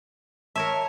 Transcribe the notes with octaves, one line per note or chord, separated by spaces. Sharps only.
A#4 C#5 E5 A5